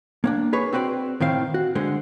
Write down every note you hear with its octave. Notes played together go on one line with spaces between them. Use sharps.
A#3 C#4 D4
G#4 B4 C#5
C4 F#4 B4 C5 D5
A2 D#3 C4 F5
F#4
D3 G#3 C5